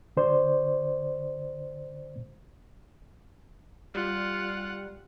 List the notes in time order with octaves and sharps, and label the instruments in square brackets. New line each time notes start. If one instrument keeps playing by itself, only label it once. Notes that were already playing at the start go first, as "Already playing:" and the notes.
[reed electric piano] D3 C5 D5
[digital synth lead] G3 [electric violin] F4 F#5